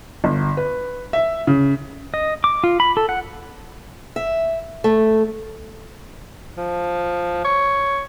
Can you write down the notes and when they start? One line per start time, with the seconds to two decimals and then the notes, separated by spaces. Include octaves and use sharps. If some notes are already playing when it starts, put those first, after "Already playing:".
0.24 G1
0.57 B4
1.13 E5
1.47 C#3
2.14 D#5
2.44 D6
2.64 F4
2.80 B5
2.97 A4
3.09 F#5
4.16 E5
4.84 A3
6.57 F3
7.45 C#5